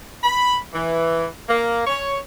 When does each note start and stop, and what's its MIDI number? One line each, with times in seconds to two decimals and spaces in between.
0.24 0.56 83
0.73 1.26 52
1.49 1.84 58
1.87 2.17 73